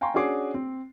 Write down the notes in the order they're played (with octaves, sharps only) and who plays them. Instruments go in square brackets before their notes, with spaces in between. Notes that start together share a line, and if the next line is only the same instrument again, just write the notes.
[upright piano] F5 G5 G#5 A#5 C6 C#6
C#4 D4 F#4 G#4 D6 C7
C4